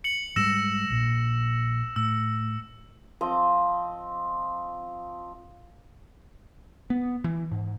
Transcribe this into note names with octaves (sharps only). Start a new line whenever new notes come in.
C#7 F#7
G#2 G3 G#3 E6 A#6 E7
A#1 A#2
A2 E6
F3 C4 D#5 D6
B3
E3
G#2